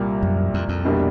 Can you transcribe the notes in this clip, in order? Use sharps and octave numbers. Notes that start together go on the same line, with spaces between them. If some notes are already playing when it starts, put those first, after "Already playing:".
Already playing: C2 A#2 G3 A#3
F#2
F2
F2
C2 B2 G3 A#3 D4